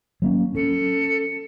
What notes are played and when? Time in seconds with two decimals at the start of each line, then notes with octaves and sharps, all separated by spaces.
0.22 F#3 A#3 C#4
0.55 C#4 A4